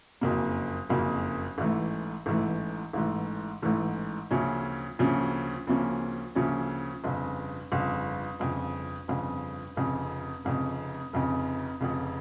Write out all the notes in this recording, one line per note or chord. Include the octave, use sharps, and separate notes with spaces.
F#1 F2 C#3 F#3 A#3
F#1 F2 C#3 F#3 A#3
A1 G#2 E3 A3
A1 G#2 E3 A3
A1 G#2 E3 A3
A1 G#2 E3 A3
D2 C#3 F3 A#3 C#4
D2 C#3 F3 A#3 C#4
D2 C#3 F3 A#3 C#4
D2 C#3 F3 A#3 C#4
G1 F2 C#3
G1 F2 C#3
G1 F2 C#3
G1 F2 C#3
F1 F2 C#3
F1 F2 C#3
F1 F2 C#3
F1 F2 C#3